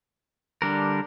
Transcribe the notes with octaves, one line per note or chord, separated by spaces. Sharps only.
D3 G3 D4 A#4